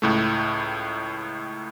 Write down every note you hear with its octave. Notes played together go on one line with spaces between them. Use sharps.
C#2 A2 A3